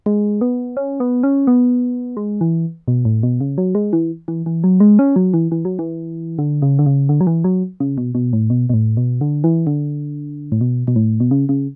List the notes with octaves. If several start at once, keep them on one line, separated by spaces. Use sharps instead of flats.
G#3
B3
C#4
B3
C#4
B3
G#3
E3
B2
A2
B2
C#3
F#3
G#3
E3
E3
E3
F#3
G#3
C#4
F#3
E3
E3
F#3
E3
D3
C#3
D3
C#3
D3
F#3
E3
F#3
C#3
B2
B2
A2
B2
B2
A2
B2
D3
E3
D3
A2
B2
B2
A2
B2
C#3
C#3